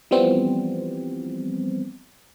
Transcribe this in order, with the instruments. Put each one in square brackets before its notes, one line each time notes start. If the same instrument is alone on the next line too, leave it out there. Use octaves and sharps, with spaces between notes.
[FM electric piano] E3 F3 G3 B3 C4